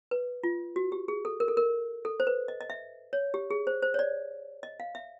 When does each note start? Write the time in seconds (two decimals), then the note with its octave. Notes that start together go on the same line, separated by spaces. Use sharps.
0.11 B4
0.43 F4
0.76 F#4
0.92 G4
1.08 G#4
1.25 A4
1.40 A#4
1.48 A4
1.57 A#4
2.05 A4
2.20 C5
2.27 B4
2.48 D#5
2.61 D#5
2.70 E5
3.13 C#5
3.34 G4
3.50 G#4
3.67 C5
3.82 C5
3.94 C#5
3.99 D5
4.63 D#5
4.80 F5
4.95 E5